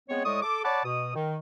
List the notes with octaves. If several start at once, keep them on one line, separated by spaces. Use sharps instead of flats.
G#3 B3 C4 C#5
A2 G#3 D5 C#6 D#6
A4 D6
C#5 D5 F#5 A5 B5 D6
B2 D#6
D#3